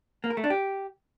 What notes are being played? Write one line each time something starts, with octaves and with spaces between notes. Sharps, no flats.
A#3
A#4
A3
D4
G4